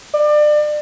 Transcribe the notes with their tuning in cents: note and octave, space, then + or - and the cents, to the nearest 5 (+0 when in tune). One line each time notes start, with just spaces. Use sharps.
D5 +30